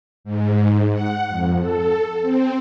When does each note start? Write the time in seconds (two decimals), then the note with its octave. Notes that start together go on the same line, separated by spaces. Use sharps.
0.24 G#2
0.93 F#5
1.29 F2
1.60 A4
2.22 C4